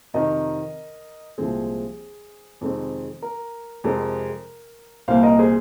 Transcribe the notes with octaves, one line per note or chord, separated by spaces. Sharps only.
F2 C3 D#3 A#4 D#5
C2 A#2 F3 G#3 C4 G#4 C5
F2 C3 D#3 G#3 C4
A#4
F2 C3 G#3 C4 A#4
C2 A#2 A#3 C5 F5
A#4 D#5
G#4 C5